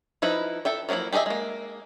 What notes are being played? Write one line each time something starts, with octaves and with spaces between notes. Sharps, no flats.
F3 D#4 E4 B4
A4 E5 G5
F3 F#3 G#3 A#3 E4
G4 G#4 A#4 D#5 E5
G#3 A#3